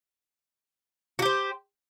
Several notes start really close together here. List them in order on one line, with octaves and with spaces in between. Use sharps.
F#4 G4 C5